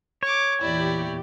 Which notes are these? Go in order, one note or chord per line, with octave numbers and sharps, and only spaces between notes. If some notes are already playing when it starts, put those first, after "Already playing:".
C#5 C#6 D6
E2 A#2 E4 G4 D5